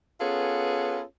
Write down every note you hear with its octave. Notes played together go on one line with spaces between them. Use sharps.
B3 C#4 F4 G#4 A4 B4